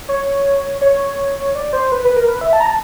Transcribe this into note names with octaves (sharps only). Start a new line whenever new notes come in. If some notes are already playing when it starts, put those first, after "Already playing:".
C#5
C#5
D5
C5
B4
B4
A#4
B4
E5
A5
A#5
A5